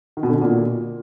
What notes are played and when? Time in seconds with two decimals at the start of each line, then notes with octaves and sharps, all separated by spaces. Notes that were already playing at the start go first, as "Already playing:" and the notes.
0.17 D#3
0.23 B2
0.29 D3
0.35 B2
0.41 A#2